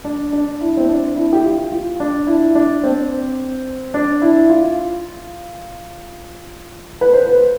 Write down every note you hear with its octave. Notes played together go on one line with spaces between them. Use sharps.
D4
D4
E4
C4
D4
E4
G4
F4
F4
D4
E4
D4
C4
D4
E4
F4
B4
C5
B4